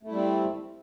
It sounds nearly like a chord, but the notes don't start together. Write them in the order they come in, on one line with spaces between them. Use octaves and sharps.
A3 E4 G3 C4